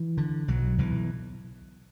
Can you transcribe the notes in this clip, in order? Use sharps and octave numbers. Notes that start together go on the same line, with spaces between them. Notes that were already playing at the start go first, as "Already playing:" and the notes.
Already playing: E3
D3
B1 F#3
B1 E3